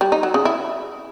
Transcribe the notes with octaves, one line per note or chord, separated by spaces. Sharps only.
G3
D#4
F#3
C#3
E4